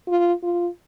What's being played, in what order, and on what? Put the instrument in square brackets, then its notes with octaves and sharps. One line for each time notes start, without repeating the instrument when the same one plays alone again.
[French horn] F4
F4